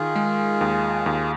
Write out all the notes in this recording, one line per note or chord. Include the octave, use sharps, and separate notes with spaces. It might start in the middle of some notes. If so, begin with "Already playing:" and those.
Already playing: D#3 F4 G#4
G#3
D#2
D#2